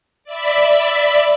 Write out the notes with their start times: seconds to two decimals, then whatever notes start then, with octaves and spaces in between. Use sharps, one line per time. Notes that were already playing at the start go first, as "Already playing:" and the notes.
0.24 D5 E5 B5